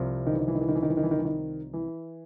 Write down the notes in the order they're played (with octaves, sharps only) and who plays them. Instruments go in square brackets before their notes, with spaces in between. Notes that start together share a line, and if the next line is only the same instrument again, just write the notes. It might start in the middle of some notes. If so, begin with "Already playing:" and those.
Already playing: [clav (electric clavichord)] C2 C3 F3
[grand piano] D#3
E3
D#3
E3
D#3
E3
D#3
E3
D#3
E3
D#3
E3
D#3
E3
D#3
E3